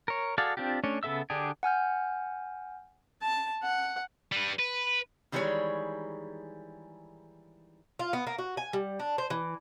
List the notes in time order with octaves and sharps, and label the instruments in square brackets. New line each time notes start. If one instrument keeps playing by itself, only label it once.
[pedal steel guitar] A#4 C#5
F#4 G#4 A4 D5 F5
C4 D4 F4 G4
A3 C#4 D4 C#5
C#3 B3 A4 E5 E6
D3 D4 G4 G#4
[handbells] F#5 G#5 F6 G6
[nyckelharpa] A5
F#5
[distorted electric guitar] G3 B4
B4
[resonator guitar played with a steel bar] D#3 E3 G3 G#3 G#4 C#5
[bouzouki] F4
B3
A#3
F#4
G#5
G3
D4
C5
E3